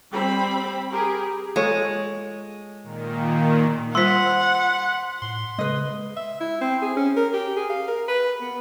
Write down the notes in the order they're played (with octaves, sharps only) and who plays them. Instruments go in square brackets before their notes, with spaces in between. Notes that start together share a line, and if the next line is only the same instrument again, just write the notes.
[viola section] G3 C4 B5
G4 G#4 A#4
[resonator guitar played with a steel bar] G#3 [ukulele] F4 A4 C#5
[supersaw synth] A#2 D#3
[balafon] G3 F4 C5 [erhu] F#5 [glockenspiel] C6 B6
[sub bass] A2 [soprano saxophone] C6
[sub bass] C#3 [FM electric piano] G#3 [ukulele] B4 D#5
[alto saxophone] E5
E4
C4
G#4
C#4
A#4
G4
G#4
F5
A#4
B4
B3